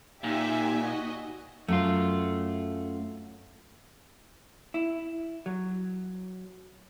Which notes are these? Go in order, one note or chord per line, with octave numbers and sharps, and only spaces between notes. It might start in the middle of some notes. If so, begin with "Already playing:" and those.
A#2 D#4 G4 E5 G#5
F#4 D#5
F#2 A3 F4
E4
F#3